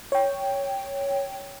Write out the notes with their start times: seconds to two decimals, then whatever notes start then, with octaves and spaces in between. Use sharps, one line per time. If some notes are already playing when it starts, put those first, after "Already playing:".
0.12 C#5 G5